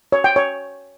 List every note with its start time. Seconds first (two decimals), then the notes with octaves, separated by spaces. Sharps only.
0.12 C#5
0.24 G5
0.36 C#5